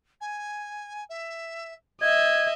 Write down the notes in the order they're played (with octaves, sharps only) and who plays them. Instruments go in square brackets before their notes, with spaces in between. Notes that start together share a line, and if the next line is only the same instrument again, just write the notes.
[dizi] G#5
E5
[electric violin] D#5 E5 [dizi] G#6